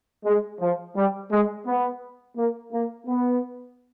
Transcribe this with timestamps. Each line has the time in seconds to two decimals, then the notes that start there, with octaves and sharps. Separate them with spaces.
0.25 G#3
0.60 F3
0.96 G3
1.31 G#3
1.66 B3
2.36 A#3
2.72 A#3
3.07 B3